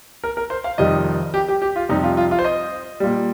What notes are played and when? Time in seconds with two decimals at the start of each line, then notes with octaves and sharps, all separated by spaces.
0.24 A#4
0.37 A#4
0.50 C5
0.64 F5
0.78 F2 C3 D#3 G3 D#5
1.34 G4
1.48 G4
1.62 G4
1.76 F4
1.89 F2 C3 G3 D#4
2.04 F4
2.17 F4
2.31 F4
2.39 C5
2.45 D#5
3.00 A#2 G3